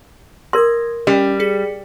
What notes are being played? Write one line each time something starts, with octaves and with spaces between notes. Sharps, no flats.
A#4 C6 D#6 G#6 A#6
G3 C#4 D5
G#4 B6 C#7